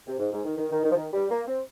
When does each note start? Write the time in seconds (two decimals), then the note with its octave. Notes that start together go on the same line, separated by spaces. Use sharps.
0.07 C3
0.19 G#2
0.33 G#2
0.45 D#3
0.57 D#3
0.71 D#3
0.84 D#3
0.91 F3
0.96 D#3
1.13 G3
1.30 A#3
1.47 C4